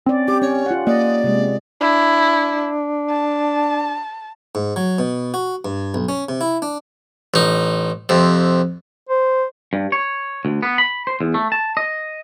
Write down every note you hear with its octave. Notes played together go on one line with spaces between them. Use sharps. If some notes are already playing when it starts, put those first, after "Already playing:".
C4 C#4 D5
G4 D6
C#4 C#5
F4 F#5
A#3 D5 D#5
C3 G#3
D4 E4
A5
G#2
F#3
B2
F#4
G2
B1
C#4
C3
E4
D4
A1 D#4
F2 C3
C5
G2
C#5
D2
B3
B5
C5
E2
A3
A5
D#5